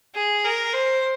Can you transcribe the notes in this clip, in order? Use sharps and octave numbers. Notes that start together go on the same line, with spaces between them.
G#4
A#4
C5